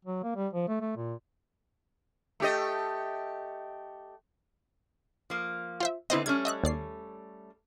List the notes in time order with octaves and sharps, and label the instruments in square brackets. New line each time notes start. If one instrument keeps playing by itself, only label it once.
[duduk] F#3
A#3
G3
F3
A3
A3
A#2
[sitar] A3 G4 D#5
[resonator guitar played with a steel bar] F3 A#3
[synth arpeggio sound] F4 C5 E5
[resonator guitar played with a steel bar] D3 B3 C4 [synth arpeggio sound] E4 C5 D#5
[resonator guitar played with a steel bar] G3 A3 C#4 [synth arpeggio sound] G#6
[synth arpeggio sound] D#5 E5 F#6
D#2 D5 C7